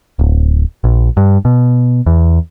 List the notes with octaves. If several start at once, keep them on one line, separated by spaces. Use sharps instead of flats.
D1
A#1
G2
B2
E2